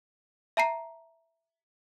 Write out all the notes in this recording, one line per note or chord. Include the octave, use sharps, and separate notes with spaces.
E5 A5 A#5 C7